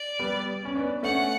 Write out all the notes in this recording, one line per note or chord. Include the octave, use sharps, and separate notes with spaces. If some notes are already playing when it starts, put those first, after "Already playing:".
Already playing: D5
G3 B3
C#4
B3 D4
A3 C#4 F#5